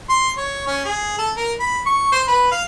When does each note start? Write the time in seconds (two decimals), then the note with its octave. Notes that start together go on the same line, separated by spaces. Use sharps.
0.10 C6
0.38 C#5
0.67 C#4
0.85 G#4
1.19 A4
1.37 A#4
1.60 B5
1.87 C#6
2.12 C5
2.28 B4
2.52 F5